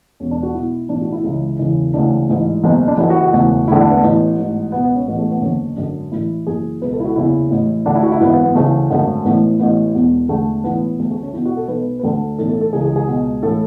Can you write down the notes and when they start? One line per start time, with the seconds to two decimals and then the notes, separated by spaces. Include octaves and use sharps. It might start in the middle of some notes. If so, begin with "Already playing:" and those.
0.20 E1 E2 B2 C#4
0.31 D4
0.43 F#4
0.54 B1 B2 E4
0.89 B1 A2 E3 D4
1.01 F#4
1.12 E4
1.24 C#2 C#3 E3
1.59 E1 E2 C#3 E3
1.94 D2 C#3 E3 D4
2.29 A1 G#2 E3
2.63 F#1 E2 B2
2.88 D4
2.98 F#1 F#2 E3 E4
3.10 F#4
3.21 F#4
3.33 E1 D2 C#3 E3 F#4
3.68 E1 D2 D3 E4
3.80 D4
3.91 B3
4.02 A1 A2 E3
4.37 A1 G#2 E3
4.72 C#2 B3
4.76 B2
4.84 B3
4.95 C#4
5.07 A1 A2 E3 B3
5.19 A3
5.30 B3
5.41 F#1 E2 D3 C#4
5.77 G#1 F#2 D3 D4
6.11 A1 A2 E3 E4
6.47 F#1 F#2 E3 G#4
6.81 C#2 B2 B4
6.93 A4
7.00 E4
7.04 F#4
7.16 F#1 E2 C#3 E3 E4
7.50 A1 A2 E3
7.86 D2 D3 D4
7.95 E4
8.03 F#4
8.12 E4
8.20 G#1 F#2 E3 B3
8.32 B3
8.43 B3
8.55 D2 C#3 E3 A3
8.90 G#1 F#2 D3
9.24 A1 A2 E3 B3
9.59 A1 A2 E3 B3
9.94 E1 E2 B2
10.29 E1 E2 D3 A3
10.64 B1 A2 E3 B3
10.99 D2 D3 B3
11.11 A3
11.23 C#4
11.33 B1 B2 E4
11.45 F#4
11.57 A4
11.68 B1 B2 B4
11.99 B4
12.03 D2 D3 A4
12.38 B1 A2 E3 A4
12.49 A4
12.61 A4
12.73 C#2 C#3 E3 G#4
12.85 G#4
12.96 G#4
13.08 C#2 B2
13.42 A2 E3 A4